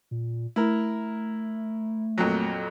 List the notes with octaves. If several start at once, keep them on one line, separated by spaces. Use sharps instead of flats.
A#2
A3 E4 A#4
F2 A#2 F#3